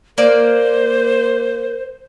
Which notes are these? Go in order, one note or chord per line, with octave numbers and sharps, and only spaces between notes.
A#3 A#4 C5 D5